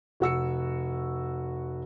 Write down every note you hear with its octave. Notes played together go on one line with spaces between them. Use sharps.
F1 F#4 E6 C#7